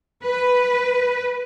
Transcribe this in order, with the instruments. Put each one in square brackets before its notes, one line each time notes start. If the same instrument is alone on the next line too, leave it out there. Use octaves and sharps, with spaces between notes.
[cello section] B4